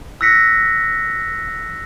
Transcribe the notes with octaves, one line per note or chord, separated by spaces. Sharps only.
E6 F#6 A#6 B6 C#7